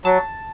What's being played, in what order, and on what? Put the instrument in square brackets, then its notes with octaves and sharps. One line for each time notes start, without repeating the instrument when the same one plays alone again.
[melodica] F#3 [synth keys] A5